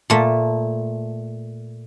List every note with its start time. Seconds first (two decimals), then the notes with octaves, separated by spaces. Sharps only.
0.10 A#2 A3